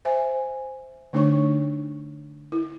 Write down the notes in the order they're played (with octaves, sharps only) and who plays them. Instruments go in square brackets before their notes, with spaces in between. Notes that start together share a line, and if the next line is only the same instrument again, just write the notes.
[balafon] C5 E5 G#5
D3 A3 D4 D#4 C#5 C#6
E4